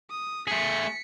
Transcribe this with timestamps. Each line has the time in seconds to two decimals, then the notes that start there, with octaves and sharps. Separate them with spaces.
0.10 D#6
0.47 A3 G#4 B6 C#7